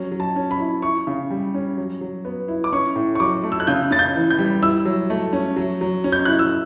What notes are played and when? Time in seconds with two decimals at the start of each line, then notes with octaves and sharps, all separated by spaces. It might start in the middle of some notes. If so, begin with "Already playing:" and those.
Already playing: F#3 C#4
0.12 F#3
0.20 A5
0.36 C#4
0.51 B5
0.60 E4
0.82 E4 C#6
1.07 C#3
1.30 G3
1.54 C#4
1.78 F#3
2.01 F#3
2.25 B3
2.48 E4
2.64 D6
2.73 C#4 C#6
2.96 A2
3.15 C#6
3.20 F#3 D6
3.43 A3
3.52 E6
3.60 F#6
3.67 C#3 G6
3.91 C#3 A6
3.99 G6
4.15 E3
4.30 G6
4.39 G3
4.62 E4 E6
4.85 F#3
5.10 A3
5.33 C#4
5.56 F#3
5.81 F#3
6.04 C#4
6.12 G6
6.25 E4 F#6
6.39 E6